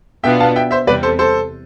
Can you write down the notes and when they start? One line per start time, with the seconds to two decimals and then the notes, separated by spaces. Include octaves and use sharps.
0.24 B2 B3 D4 F4 E5 G5
0.40 F5 A5
0.56 E5 G5
0.71 C5 E5
0.87 E2 C3 G3 B4 D5
1.03 A4 C5
1.19 A4 C5